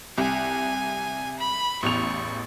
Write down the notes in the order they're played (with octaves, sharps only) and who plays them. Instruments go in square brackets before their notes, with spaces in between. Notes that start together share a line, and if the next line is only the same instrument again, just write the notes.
[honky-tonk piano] C2 [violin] G#5
[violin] B5
[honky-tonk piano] A1 E2 F7 [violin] C#6